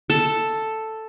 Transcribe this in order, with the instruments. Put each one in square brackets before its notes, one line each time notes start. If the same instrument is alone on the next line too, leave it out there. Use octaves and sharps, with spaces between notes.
[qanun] A4